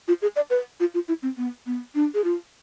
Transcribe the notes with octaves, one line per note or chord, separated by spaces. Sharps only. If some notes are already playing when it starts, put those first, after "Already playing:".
F4
G#4
D5
B4
F4
F4
E4
C4
B3
B3
D4
G#4
F4